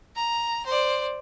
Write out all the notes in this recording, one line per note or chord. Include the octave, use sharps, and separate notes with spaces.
A#5
C5 D5